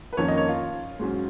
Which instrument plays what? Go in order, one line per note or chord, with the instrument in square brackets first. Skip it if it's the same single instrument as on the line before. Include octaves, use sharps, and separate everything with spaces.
[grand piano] B4
F2 D#3 A#3 C#4 C#5
D#5
C#5
F4
G#2 F#3 C#4